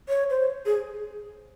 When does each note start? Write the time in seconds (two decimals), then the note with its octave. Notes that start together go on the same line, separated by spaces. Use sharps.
0.09 C#5
0.30 C5
0.66 G#4